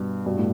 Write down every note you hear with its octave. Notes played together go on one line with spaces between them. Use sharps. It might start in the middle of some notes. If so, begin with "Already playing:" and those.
Already playing: G2 B2
G2 B2
A2